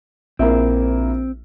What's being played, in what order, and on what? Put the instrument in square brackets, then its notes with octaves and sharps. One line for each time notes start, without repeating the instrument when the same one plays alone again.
[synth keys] A#1 [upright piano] A#3 E4 [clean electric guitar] C4